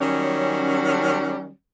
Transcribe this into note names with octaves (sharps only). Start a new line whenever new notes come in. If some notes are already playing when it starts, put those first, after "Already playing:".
D#3 F#3 G3 C#4